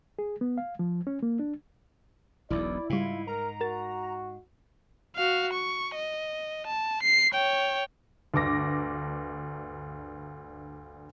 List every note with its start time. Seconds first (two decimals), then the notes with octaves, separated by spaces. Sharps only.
0.19 G#4
0.41 B3
0.58 F5
0.79 F3
1.07 C#4
1.23 A#3
1.39 D4
2.50 E1 B1 E2 E4 D5
2.90 G#2 C#3 G3 F4
3.27 A#4 A#5
3.61 F#4 A#4 A6
5.16 F#4 F5
5.53 C#6
5.95 D#5
6.67 A5
7.03 C7
7.32 C#5 G5
8.34 D2 G2 D6 A#6